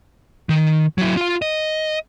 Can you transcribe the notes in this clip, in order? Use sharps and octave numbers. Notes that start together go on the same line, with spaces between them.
D#3
F#3 E4
F4 F5
D#5